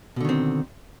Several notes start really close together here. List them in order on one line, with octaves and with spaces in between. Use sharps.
B2 D3 D#3 C4